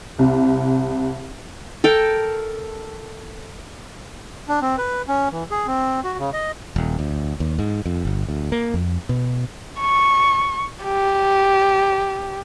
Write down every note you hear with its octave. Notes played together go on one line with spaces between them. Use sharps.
C2
A4 A#4 G5
D4
C4
B4
C#4
E3
G#4
C4
F#4
C#3
D#5
D#1
D2
D#2
G#2
F2
G1
D2
A#3
F2
B2
C#6
G4